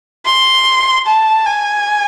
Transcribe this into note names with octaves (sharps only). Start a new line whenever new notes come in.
C6
A5
G#5